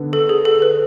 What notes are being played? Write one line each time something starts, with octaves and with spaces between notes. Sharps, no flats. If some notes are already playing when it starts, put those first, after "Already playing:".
Already playing: D3 B3
A4
G#4
A4
B4